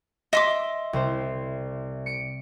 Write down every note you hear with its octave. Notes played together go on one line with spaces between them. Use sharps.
D#5 E5 C6 D6 B6
C2 C5
C#7 D7